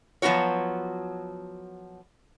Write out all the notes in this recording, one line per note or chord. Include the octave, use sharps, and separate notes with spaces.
F3 F#3 B3 F4 F#4 C#5